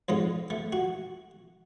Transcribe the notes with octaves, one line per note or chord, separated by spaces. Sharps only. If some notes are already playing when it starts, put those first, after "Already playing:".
F2 G#2 D#5
A3
F#4